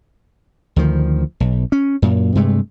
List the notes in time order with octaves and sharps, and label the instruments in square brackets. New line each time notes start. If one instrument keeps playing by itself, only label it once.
[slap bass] D2 D#3 F3
B1
C#4
F#2 A#2
G2 C3 G#3 A3